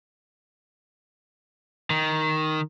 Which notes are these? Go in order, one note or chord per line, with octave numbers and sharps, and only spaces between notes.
D#3